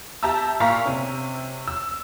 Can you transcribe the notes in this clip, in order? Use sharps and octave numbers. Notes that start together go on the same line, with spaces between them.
G4 E5 A5 A#5 E6
A#2 F5 A#5 C#6 F6 B6
C3 C#4
E6